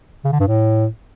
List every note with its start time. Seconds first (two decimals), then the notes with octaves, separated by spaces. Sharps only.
0.25 C#3
0.32 D3
0.40 G2
0.48 A2